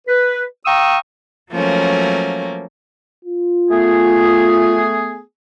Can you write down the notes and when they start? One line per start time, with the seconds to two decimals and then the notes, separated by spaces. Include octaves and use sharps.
0.07 B4
0.65 F5 G5 A#5 C#6 D#6 E6
1.53 F3 F#3 A3 A#3 C#4
3.25 F4
3.70 A3 B3 G#4